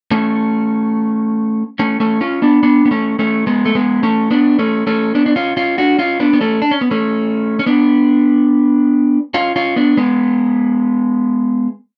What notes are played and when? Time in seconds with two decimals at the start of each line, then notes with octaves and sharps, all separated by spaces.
0.11 A3 C#4
1.79 A3 C#4
2.00 A3 C#4
2.21 C#4 F4
2.42 B3 D4
2.63 B3 D4
2.85 B3
2.91 A3 C#4
3.19 A3 C#4
3.47 G#3 B3
3.65 A3
3.75 G#3 B3
4.03 A3 C#4
4.31 B3 D4
4.59 A3 C#4
4.87 A3 C#4
5.15 B3 D4
5.26 D4
5.36 C#4 F4
5.57 C#4 F4
5.78 D4 F#4
5.99 C#4 F4
6.20 B3 D4
6.33 B3
6.41 A3 C#4
6.62 D4
6.71 C#4
6.81 B3
6.91 A3 C#4
7.59 C#4
7.66 B3 D4
9.34 C#4 F4
9.56 C#4 F4
9.76 B3 D4
9.97 G#3 B3